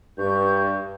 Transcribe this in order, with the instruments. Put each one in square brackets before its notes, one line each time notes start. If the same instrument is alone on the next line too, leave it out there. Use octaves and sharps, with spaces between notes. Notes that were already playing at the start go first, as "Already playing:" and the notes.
[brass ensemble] G2 [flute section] G4 C#6 G6